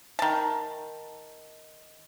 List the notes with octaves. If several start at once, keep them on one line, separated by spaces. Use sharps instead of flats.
D#3 A5